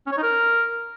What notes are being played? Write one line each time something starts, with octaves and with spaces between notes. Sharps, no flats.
C#4
C#5
D#4
A#4